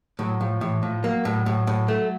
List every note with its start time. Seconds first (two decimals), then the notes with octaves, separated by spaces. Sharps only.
0.19 A2 F#3
0.41 A2 F3
0.61 A2 E3
0.83 A2 F3
1.04 F#3 A#3
1.25 A2
1.46 A2
1.67 A2
1.88 A3